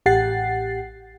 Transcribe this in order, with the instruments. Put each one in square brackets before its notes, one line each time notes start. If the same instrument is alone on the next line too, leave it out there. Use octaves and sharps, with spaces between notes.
[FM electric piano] A1 G4 F#5 A6 C7